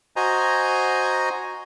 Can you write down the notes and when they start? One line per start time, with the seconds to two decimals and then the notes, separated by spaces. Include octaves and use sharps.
0.16 F#4 C5 D#5 G#5 A#5